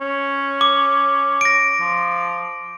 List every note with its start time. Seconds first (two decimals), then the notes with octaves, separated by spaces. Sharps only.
0.01 C#4
0.61 D6
1.41 A#6 D7
1.80 F3